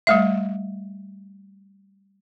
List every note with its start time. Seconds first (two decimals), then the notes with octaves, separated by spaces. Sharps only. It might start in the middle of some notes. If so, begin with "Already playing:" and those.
0.07 G3 A3 E5